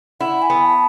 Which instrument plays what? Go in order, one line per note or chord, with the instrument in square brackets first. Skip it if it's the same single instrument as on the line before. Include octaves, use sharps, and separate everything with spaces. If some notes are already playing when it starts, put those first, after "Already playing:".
[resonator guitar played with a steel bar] E4 [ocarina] F#5
[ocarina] G#5
[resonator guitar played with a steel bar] B3
[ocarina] A5